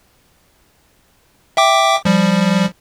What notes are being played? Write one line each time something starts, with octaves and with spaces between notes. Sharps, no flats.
E5 G5 D6
F3 G3